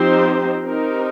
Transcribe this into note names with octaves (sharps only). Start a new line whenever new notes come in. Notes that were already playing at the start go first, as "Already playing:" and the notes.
Already playing: F3 C4 D#4 G4 C5
C4 D#4 G4 A#4